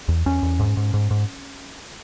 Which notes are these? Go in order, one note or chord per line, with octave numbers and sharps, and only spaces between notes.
E2
E2 C#4
E2
G#2
G#2
G#2
G#2